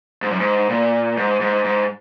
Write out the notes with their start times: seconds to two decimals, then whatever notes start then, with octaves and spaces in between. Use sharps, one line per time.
0.22 G#2
0.31 F#2
0.40 G#2
0.69 A#2
1.17 G#2
1.40 G#2
1.64 G#2